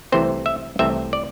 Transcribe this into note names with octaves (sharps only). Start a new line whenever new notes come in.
C2 C3 E3 A3 C4 C5
E5
C2 C3 E3 A3 C4 E5
D5